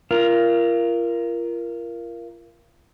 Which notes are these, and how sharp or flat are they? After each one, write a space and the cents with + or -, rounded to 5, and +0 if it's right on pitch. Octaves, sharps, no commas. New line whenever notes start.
F4 -35 A#4 +10